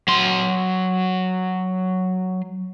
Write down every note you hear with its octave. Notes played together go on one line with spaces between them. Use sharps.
F#3 C6